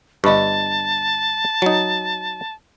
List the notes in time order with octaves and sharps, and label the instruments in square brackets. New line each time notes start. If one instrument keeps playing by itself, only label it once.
[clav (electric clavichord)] G1 G2 [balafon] D#5 B5 C#6 [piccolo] A5
[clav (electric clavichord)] F#3 D#4